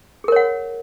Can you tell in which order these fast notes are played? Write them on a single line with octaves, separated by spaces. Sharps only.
G#4 A#4 C#5 F#5